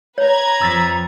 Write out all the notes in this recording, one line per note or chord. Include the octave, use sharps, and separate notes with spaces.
B4 C#5 A#5 G#6
F2 F3 E6 A6 B6